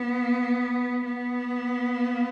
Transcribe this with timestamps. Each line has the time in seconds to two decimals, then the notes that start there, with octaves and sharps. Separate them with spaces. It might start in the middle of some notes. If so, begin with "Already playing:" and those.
Already playing: B3
1.06 B3